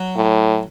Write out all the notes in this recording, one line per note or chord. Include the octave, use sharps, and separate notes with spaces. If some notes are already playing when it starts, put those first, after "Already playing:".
Already playing: F#3
A2